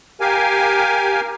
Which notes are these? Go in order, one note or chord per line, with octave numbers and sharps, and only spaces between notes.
G4 A#4 F5 G#5